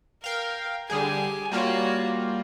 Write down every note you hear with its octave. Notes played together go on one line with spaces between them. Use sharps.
A#4 F5 G5
D3 G3 G4 G#4 G#5
G3 A#3 F4 F#4 C#5